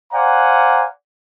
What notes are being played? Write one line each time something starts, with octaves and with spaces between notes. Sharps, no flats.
C5 D5 F5 F#5 G#5 A#5